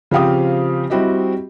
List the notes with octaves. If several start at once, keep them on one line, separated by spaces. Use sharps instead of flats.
C#3 F3 C4 G4 F5 D#6
G3 C4 E4 F#4 G4 D#5